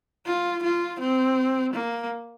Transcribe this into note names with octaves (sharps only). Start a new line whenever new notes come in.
F4
F4
C4
A#3